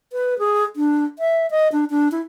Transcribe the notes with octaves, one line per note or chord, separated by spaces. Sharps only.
B4
G#4
D4
E5
D#5
D4
D4
E4